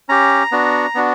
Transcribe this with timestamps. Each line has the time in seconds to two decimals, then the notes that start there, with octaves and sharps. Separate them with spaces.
0.09 C#4 G4 A#5
0.52 B3 D4 F#4
0.95 B3 D4 F#4